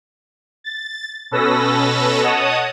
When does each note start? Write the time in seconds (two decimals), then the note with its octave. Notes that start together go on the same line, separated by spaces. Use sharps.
0.64 A6
1.31 B2 C#4 A4 B4 E6 A#6
2.21 C#5 D#5 F#5 A5 D#6